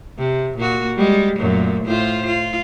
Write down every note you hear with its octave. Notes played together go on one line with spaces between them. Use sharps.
C3
A#2 A#3 F#4
G3 G#3
F#2 A#2 A3
A2 F4 C5
F4